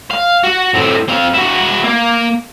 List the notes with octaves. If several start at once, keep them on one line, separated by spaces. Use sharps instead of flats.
F5
F#4
A2 C4
C4 F5
E4 F#4
A#3